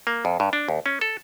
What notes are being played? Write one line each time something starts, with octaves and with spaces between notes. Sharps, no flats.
A#3
F2
G2
D4
D#2
C#4
A4